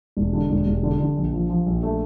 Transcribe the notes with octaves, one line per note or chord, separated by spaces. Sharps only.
E1
D3
E1
E1
D3
D3
A#1
F3
F3
A#1
A3